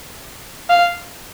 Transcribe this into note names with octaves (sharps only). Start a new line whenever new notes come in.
F5